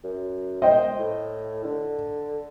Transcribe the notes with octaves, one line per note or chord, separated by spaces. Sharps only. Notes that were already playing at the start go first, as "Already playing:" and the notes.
F#2
C5 D#5 G5
A2
D3